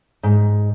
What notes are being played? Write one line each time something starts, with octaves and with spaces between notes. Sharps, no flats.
G#2